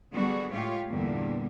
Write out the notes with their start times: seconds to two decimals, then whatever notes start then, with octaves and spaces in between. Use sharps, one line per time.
0.13 D3 F#3 G3 B3 F#4 G#4
0.52 A2 G#3 F4 G4 C#5 F5
0.88 E2 G2 A#2 D3 G3 A#3